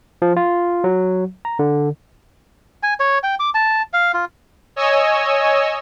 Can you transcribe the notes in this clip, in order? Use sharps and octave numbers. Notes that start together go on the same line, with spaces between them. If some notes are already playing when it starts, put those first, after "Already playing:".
F3
F4
F#3
A#5
D3
G#5
C#5
G5
D6
A5
F5
F4
C#5 D#5 G#5 E6